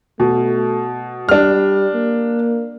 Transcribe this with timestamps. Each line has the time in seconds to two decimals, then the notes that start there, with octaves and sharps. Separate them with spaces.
0.20 B2 A3
1.29 G3 D4 F6
1.95 A#3